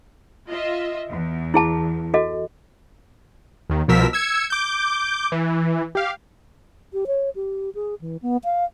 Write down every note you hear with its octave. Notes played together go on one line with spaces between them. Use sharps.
F4 D#5 E5
E2
E4 G#4 A5
F#4 A4 D#5
D#2 D#3
C2 B2 F3 A#4 E6 B6
E6 G#6 C#7
D6 G6
E3
G4 F5
G4
C#5
G4
G#4
E3
B3
F5